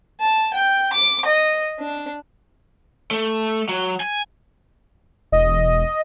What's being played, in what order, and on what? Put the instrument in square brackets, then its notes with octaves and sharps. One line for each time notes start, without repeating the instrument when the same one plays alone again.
[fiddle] A5
G5
D6
D#5
D4
[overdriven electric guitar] A3
F#3
G#5
[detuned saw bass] E1 [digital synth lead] D#5